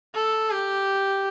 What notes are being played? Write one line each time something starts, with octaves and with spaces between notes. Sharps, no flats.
A4
G4